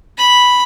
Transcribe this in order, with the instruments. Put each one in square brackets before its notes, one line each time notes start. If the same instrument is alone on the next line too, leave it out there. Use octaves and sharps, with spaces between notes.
[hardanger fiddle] B5